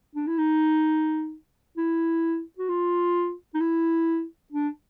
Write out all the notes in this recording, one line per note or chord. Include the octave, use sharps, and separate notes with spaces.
D4
E4
D#4
E4
F#4
F4
D#4
E4
D4